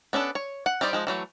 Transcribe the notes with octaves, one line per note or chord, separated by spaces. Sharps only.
B3 C#4 D4 A4
C#5
F#5
G3 D#4 G4 C5 D5
F3 G#3 D#4
E3 F#3 A3